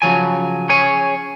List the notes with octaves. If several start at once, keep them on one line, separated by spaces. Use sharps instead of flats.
C#3 F3 F#3 G#5
C#4 G#4 C#5 G#5